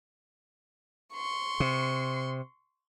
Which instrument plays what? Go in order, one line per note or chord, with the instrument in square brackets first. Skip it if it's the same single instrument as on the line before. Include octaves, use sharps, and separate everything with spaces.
[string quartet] C6 C#6
[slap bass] C3